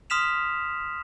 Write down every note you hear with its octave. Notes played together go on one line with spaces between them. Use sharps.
C6 D#6 F6 B6 E7 F7